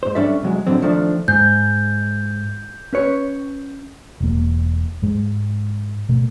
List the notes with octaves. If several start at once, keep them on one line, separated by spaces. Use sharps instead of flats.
G#2 C5
G3 C#4 D4 A4 E5
C2 F#3 G#3
A2 D3 F#3 C4
D#3 F3 A3 D4
G#2 G6
C#4 B4 C#5
E1 A#3
G#2 G#3
B2 A3